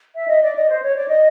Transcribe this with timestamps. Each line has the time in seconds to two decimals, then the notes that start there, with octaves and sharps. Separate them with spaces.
0.15 E5
0.28 D#5
0.42 D5
0.55 D#5
0.70 C5
0.82 C#5
0.96 D5
1.08 D#5